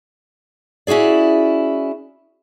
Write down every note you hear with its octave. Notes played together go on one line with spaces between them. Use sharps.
C#4 E4 F#4 G#4 D5